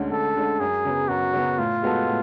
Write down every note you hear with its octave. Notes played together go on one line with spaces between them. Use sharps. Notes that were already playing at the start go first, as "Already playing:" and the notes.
Already playing: D2 D3 G#3 C#4
D2 A4
D3 G#3 C#4
F#2 G#4
C#3 F#3 B3
F#2 F#4
C#3 F#3 B3
A2 F4
G#3 B3 F#4 A4
A2